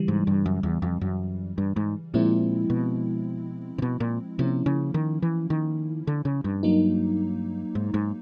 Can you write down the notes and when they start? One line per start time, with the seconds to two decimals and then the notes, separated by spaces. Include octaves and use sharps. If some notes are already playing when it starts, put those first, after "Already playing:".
Already playing: C#3 E3 G3
0.08 G#2
0.27 G2
0.46 F#2
0.63 E2
0.82 F2
1.01 F#2
1.58 G2
1.76 G#2
2.14 A#2 F3 G#3 C4 E4
2.70 B2
3.78 C3
3.82 B2
4.00 A#2
4.38 C3 F3 A#3 C#4 E4
4.66 C#3
4.94 D#3
5.22 E3
5.50 D#3
6.07 D3
6.25 C#3
6.44 G2
6.63 F#3 A#3 D#4
7.75 G#2
7.94 G#2